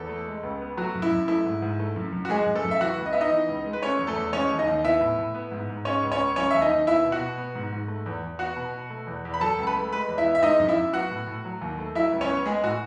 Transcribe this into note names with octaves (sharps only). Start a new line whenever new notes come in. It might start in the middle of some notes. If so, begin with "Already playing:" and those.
Already playing: E2 A4
A3
G#3
C#2
B3
F#3 A3 F#4
F#2
E4
F#2
A3 E4
G#2
G#2
A3
F#2
F#2
F#4
G#3 G#4
F#2
A3 A4
F#2
E5
E3 F#4 F#5
C#2
D#5
B3 E5
D#4 D#5
E3
C#2
G#3
B4
A3 C#4 C#5
E2
A3 A4
E2
G#3 C#4 C#5
D#2
D#4 D#5
D#2
B3 E4 E5
A2
A2
B3
G#2
G#2
G#3 C#4 C#5
C#2
C#4 C#5
C#2
F#3 C#4 C#5
D#2 E5
D#4 D#5
D#2
B3 E4 E5
B2
F#4 F#5
B2
B3
G#2
G#2
A3
E2
E2
B3 F#4 F#5
B2
B2
A3
E2
E2
B5
F#3 A4 A5
C#2 A5
B4 B5
A3
G#3 B4 B5
E2
E4 E5
B3
E5
G#3 D#4 D#5
F#2
E4 E5
F#2
B3 F#4 F#5
A2
A2
F#3
D#2
A3
F#3 E4 E5
C#2
C#4 C#5
B3
G#3 G#4
A2 F#4